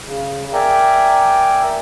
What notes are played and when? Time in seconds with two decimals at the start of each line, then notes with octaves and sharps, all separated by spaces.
0.05 C#3
0.53 A#4 D5 E5 G5 G#5 A#5